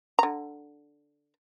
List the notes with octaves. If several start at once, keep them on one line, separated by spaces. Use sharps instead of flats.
D3 A#5